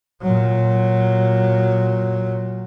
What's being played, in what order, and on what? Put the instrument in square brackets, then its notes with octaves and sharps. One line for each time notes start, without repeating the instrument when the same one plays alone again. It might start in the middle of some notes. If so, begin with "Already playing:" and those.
[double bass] A#2 F#3